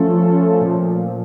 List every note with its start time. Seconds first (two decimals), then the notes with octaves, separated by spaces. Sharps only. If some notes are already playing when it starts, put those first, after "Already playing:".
Already playing: F3 A3 C#4 F4 A4
0.61 A#2 F3